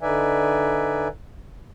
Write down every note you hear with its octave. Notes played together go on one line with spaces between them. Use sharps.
D3 D#4 B4 D5 E5 G#5